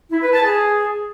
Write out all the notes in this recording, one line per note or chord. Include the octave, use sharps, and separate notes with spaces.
E4
B4
A5
G#4